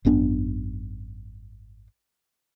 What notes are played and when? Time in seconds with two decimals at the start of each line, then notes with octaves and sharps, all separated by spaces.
0.05 G#1 F#2 B3 D4